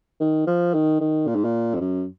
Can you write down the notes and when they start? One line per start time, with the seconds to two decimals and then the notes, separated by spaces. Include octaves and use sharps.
0.20 D#3
0.47 F3
0.74 D#3
1.01 D#3
1.27 A#2
1.36 G#2
1.45 A#2
1.75 F2
1.81 F#2